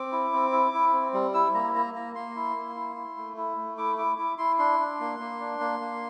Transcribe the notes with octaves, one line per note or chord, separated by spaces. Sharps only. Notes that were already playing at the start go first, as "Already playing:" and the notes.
Already playing: C4 D6
E4
C4
E4
E4
C4
G3
E4 E6
A#3 A#5
A#3 A#5
A#3 A#5
A#3 C6
E4
A#3
E4
E4
A3
E4
A3
E4 D6
E4 D6
E4 D6
E4 C6
D4 C6
D4
A#3
A#3
D4
A#3
A#3